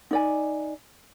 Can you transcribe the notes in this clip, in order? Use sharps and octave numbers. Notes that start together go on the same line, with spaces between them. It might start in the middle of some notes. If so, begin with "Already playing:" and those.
D#4 D5 G#5